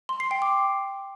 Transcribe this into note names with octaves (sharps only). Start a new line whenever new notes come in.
C6
C7
G5
D6